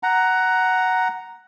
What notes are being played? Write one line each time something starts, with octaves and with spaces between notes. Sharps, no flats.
F#5 A#5